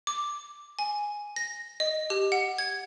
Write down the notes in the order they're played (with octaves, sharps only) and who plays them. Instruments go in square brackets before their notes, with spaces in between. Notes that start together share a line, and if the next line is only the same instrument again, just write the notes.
[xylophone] D6
G#5
A#6
D#5
G4
F#5
G#6